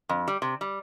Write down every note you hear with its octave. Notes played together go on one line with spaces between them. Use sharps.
F2
G3
C3
G3